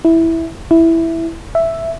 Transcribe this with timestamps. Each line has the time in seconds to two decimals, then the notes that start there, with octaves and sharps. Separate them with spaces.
0.05 E4
0.71 E4
1.55 E5